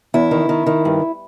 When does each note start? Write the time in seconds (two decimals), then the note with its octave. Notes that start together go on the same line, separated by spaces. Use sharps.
0.14 E2 E4
0.31 D#3
0.49 D#3
0.66 D#3
0.85 G2